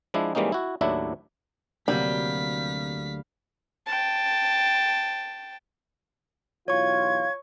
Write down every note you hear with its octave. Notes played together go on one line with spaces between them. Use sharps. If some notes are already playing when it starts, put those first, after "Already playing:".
F3 G#3 D4 E4
E3 G3 G#3 A#3 C#4 D#4
E4 F#4
D#2 A2 F#3 D4 E4 E5
D2 C3 F#3 G3 A#3 F5 G6 B6
G5 A5
B1 E3 F4 C#5 C#6 G#6